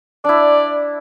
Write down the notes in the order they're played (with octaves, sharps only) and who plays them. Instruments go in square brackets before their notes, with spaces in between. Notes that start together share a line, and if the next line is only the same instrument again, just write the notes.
[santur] D4 E4 [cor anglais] D5